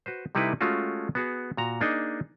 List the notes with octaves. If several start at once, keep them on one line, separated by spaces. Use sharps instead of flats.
F#4 B4 C5
C3 G3 D#4 E4 A4 B4
G#3 A3 C#4 F4 F#4
B3 F#4 G#4
A#2 F#4 A#5
A#3 D4 D#4 G#4 D#5